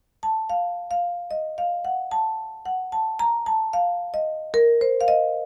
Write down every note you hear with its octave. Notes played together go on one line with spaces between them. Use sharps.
A5
F5
F5
D#5
F5
F#5
A5
F#5
A5
A#5
A5
F5
D#5
A#4
C5
F5
D#5